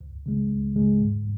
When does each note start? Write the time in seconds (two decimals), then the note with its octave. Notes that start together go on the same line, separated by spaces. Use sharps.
0.01 C#2
0.26 C#3 G#3
0.51 C#2
0.75 C#3 G#3
1.01 G#2